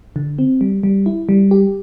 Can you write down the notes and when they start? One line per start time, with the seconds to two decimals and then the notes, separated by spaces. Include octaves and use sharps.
0.16 D3
0.39 C4
0.61 G3
0.83 G3
1.06 E4
1.29 G3
1.51 G4